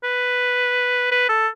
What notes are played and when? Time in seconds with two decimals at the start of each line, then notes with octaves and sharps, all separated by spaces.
0.04 B4
1.12 B4
1.29 A4